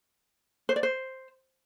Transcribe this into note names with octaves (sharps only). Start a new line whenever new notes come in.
C5
D5
C5